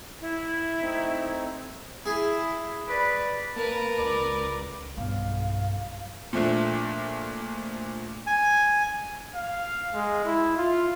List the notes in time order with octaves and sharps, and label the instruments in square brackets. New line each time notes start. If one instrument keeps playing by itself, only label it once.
[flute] E4
[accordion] A3 C4 D#4
[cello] E4 [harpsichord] G#4
[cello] B4 D5
[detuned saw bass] A#3 [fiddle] A#4 B4 [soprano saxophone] A5
[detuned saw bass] C#2 [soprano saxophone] D5
[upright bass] B1 G2 [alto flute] F5
[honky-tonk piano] A#2 F3 A3 D4
[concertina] G#5
[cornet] F5
G#3
E4
F4